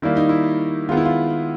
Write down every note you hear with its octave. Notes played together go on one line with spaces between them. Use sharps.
D#3 G3 A#3 E4
D#4
E4
D#3 G#3 B3 F4
E4
F4